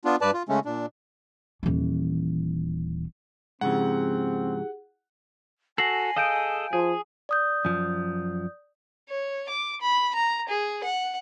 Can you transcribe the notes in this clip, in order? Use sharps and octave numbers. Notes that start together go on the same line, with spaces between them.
B3 D4 F4
G2 B4 D5 A5
F4
C#3 G#3 A3 C#4
A#2 D4
D#1 E3
G#2 C#3 F3 C4 E4 G4 G#4 F#5
F#4 A4 G#5 A#6 C7 F#7
G#4 A4 D#5 F5 G6 D7
F3 G#4
D5 D#6 G6
F#2 F3
C#5
D6
B5
A#5
G#4
F#5